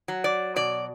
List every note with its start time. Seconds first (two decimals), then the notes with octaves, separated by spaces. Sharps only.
0.08 F#3
0.24 D5
0.56 B2 D5